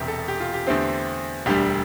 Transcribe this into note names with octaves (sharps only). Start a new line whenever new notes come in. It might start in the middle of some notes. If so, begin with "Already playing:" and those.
Already playing: E1 E2 C3 G4
A4
G4
F4
G4
E2 D3 A3 C4 G4
E1 D2 D3 G3 G4